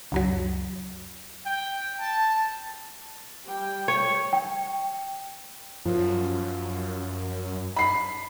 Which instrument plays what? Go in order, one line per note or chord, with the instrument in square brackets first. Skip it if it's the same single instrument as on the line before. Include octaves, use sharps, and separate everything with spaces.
[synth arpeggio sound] C#2 F#2 F#3
[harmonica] G5
A5
[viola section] G3 G5
[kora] C#5
[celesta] G5
[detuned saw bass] F#2 [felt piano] F3
[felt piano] B5 C7